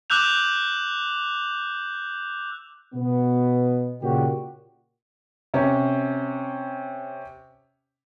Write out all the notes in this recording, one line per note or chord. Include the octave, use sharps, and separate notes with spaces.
D6 E6 F#6 G6 F7
B2 B3
A#2 C#3 F#4 G4
C3 C#4